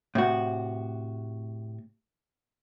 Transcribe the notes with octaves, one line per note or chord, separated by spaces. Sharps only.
A2 C3 F#4